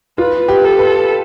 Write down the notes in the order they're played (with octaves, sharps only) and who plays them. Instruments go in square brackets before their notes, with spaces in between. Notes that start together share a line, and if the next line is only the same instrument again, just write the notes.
[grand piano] F4 [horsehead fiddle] B4
[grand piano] G4
[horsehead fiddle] A4
[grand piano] B4